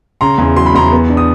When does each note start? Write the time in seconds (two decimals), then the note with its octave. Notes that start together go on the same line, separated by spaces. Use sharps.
0.21 C#3 A#5 C6
0.38 E2
0.56 F#3 C6
0.66 B5
0.74 E2 A#5 C6
0.92 B3
1.10 D4
1.17 D#6